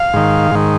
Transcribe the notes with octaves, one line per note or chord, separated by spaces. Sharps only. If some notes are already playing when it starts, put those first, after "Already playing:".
Already playing: F5
G#2 D#3
G#2 D#3